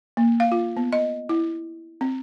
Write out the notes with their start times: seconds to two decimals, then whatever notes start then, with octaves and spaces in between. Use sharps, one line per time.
0.17 A#3
0.40 F5
0.52 F4
0.77 B3
0.93 D#5
1.29 E4
2.01 C4